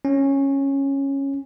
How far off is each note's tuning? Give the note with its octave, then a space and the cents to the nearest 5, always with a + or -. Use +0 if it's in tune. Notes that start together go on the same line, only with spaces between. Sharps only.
C#4 -10